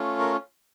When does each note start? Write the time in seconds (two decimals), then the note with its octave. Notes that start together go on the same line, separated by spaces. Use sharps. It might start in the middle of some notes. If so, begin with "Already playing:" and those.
Already playing: A3 C#4 F4
0.19 A#4